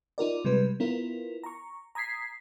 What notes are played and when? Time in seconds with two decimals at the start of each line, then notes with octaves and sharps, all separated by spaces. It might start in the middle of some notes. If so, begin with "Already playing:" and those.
0.18 D#4 F4 A#4 D5
0.45 C3 G3 G#3 B4
0.80 B3 E4 F4 A#4
1.43 A#5 C#6
1.95 A#5 D#6 G#6 B6 C7